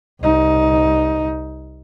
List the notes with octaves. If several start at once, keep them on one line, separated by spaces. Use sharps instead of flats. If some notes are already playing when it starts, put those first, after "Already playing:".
C2 D#4